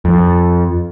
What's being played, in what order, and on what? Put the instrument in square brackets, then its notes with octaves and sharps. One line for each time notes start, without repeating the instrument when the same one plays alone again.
[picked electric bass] F2